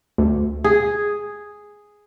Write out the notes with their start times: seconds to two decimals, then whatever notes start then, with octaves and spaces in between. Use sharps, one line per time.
0.18 D2
0.64 G#4